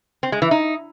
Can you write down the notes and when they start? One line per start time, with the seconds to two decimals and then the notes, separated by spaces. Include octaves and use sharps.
0.23 C4
0.32 G#3
0.42 E3
0.51 D#4